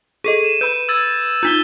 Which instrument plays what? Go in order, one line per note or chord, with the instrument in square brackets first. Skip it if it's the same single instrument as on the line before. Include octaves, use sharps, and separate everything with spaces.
[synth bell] G#4 A4 D#5 [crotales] D#7
[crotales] D#7 E7
[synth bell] B4 B5 [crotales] G6
[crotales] E6 G#6 A6
[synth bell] D#4 F4 [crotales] G6 B6 G7